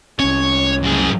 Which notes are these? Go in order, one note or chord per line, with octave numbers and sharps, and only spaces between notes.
C2 C#4 C#5
F#2 G#4